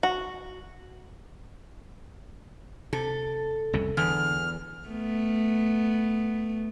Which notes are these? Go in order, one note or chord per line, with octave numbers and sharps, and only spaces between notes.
F#4
C3 A4
C2 F2 C#3
E2 D3 F6
A3 B3